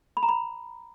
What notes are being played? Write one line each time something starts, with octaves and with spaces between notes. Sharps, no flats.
B5
A#5
B5